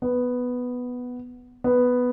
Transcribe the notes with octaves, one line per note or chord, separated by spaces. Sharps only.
B3
B3